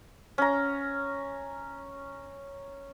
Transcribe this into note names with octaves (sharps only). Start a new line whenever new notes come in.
C#4 A#5